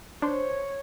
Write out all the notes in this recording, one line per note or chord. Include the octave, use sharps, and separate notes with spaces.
D4 C5 C#5